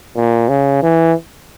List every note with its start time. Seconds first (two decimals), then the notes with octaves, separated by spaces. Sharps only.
0.16 A#2
0.49 C#3
0.83 E3